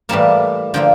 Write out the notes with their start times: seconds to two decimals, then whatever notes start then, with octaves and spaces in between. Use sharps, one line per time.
0.09 A2 E3 G3 A#3 A5
0.74 D3 F3 A#3 G5